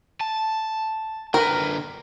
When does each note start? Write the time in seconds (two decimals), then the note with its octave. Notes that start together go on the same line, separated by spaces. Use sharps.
0.21 A5
1.34 D3 A#4 B4